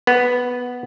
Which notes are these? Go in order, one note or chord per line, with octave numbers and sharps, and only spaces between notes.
B3